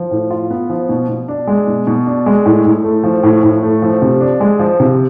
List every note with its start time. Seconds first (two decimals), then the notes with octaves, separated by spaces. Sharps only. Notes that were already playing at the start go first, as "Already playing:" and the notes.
Already playing: F3
0.11 A2
0.30 F4
0.50 B3
0.70 F3
0.89 B2
1.09 B2
1.28 D4
1.47 G#3
1.67 B2
1.87 B2
2.07 D4
2.26 G#3
2.46 A2
2.65 A2
2.84 A3
3.04 F3
3.23 A2
3.43 A2
3.63 A3
3.82 F3
4.02 C3
4.21 D4
4.40 G#3
4.59 F3
4.80 C3